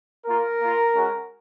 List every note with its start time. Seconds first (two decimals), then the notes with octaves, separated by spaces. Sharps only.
0.27 A#3 F4 A#4
0.61 A#3 F4
0.95 G#3 C#4 F#4